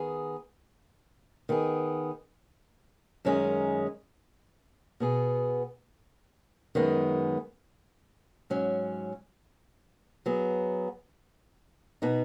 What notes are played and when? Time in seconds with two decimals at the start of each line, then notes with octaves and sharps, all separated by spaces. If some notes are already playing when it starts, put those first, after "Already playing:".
Already playing: D#3 B3 G#4
1.49 D#3 B3 G#4
3.25 F#2 D#3 G#3 C#4 G#4
5.00 B2 B3 G#4
6.75 F#2 D#3 G#3 B3 G#4
8.50 G#2 F#3 C#4
10.26 F#3 B3 G#4
12.02 B2 B3 D#4 F#4